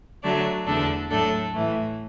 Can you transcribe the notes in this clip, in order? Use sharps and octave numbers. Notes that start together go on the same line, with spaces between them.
D3 F#3 A3 D5
E2 D3 A3 D4 A4
A2 F#3 A3 D4 A4
A2 E3 A3